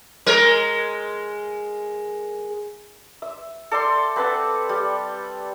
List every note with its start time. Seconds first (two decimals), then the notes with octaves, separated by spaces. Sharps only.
0.26 G#3 A#4
3.22 E5
3.71 A4 D5 G5 C6
4.16 C4 B4 F#5 A5
4.69 G3